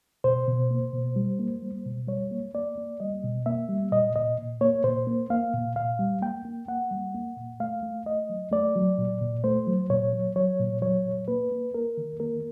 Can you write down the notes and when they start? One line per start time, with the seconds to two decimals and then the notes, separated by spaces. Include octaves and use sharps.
0.24 B2 C5
0.47 B2
0.71 A#3
0.93 B2
1.16 G3
1.39 A#3
1.62 G3
1.85 B2
2.08 G3 C#5
2.31 A#3
2.54 A#3 D5
2.78 A#3
3.00 G3 D#5
3.23 B2
3.46 A#3 E5
3.69 G3
3.92 A#2 D#5
4.16 A#2 D#5
4.38 A#2
4.61 A#3 C#5
4.84 A#2 C5
5.07 A#3
5.30 A#3 F5
5.53 A#2
5.76 A#2 F5
5.99 G3
6.22 A#3 G5
6.45 A#3
6.68 A#3 F#5
6.91 G3
7.14 A#3
7.37 A#2
7.60 A3 F5
7.83 A3
8.06 A3 D#5
8.30 F#3
8.52 A3 D5
8.75 F#3
8.98 A#2
9.21 A#2
9.44 A3 C5
9.67 F#3
9.90 A#2 C#5
10.13 F#3
10.36 F#3 C#5
10.59 A#2
10.82 F#3 C#5
11.05 A#2
11.28 A#3 B4
11.52 A#3
11.74 A#3 A#4
11.97 D#3
12.20 A#3 A#4